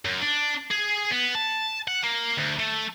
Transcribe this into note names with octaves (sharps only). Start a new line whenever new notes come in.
F#2
D4
G#4
B3
A5
F#5
A#3
D2
A3